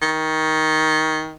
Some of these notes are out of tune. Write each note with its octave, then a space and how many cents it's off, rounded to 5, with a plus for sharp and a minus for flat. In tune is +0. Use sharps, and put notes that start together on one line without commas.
D#3 +15